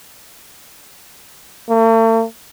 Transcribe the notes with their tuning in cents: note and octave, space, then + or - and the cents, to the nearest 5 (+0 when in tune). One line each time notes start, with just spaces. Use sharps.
A3 +45